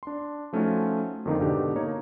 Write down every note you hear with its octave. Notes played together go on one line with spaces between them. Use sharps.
D4 C6
F3 A3 C#4 D#4 F4 F#4
F2 D3 D#3 A#3 D#4
G#2 B2 D3 D4 D#4 G4
A#3 D#4 C#5